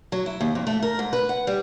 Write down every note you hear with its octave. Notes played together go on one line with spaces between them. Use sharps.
F#3
E4
D#2
F2
A3
A#4
G#2
B4
F#5
G3